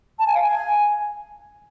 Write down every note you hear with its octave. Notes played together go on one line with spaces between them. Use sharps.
A5
G#5
F5
G#5